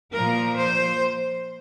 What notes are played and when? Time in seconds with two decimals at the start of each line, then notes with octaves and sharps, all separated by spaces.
0.13 A#2 F3 A#4
0.56 C5